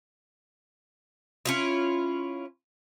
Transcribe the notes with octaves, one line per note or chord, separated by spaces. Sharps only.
C#4 E4 F4